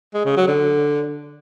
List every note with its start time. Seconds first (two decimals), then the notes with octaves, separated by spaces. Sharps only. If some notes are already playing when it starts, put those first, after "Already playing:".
0.14 G#3
0.25 C#3
0.37 F#3
0.48 D3